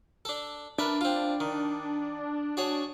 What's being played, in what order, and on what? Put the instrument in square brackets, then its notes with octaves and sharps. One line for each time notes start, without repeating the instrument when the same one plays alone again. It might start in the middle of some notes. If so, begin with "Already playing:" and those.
[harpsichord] D4 A4
[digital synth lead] D4 [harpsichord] A#4 B4 E5
[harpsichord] C4 F4
D#3
F#4 G#4 C#5